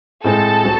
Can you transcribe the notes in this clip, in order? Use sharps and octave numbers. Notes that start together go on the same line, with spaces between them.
A2 G#3 C4 A4 A5
F#3 C4